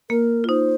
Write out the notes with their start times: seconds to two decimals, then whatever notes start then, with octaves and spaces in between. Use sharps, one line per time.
0.10 A#3 A#4
0.44 F4
0.48 D#4 C5